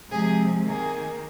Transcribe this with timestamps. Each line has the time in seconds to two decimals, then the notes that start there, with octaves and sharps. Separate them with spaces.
0.10 C3 F3 G#3 G#4
0.65 D#3 A#3 G#4